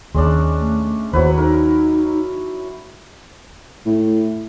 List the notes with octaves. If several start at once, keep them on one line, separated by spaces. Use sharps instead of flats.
D#2 G#3 C#4 D4
A3
D#2 F#3 E4 B4 C5
D#4 A#4
A2